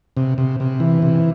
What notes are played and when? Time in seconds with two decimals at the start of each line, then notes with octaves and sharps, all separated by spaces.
0.17 C3
0.38 C3
0.60 C3
0.80 E3
1.02 C3